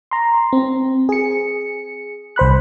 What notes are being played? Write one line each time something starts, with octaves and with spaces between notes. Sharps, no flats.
A#5 C6
C4
G#4 C#7
C2 C5 B5 F#6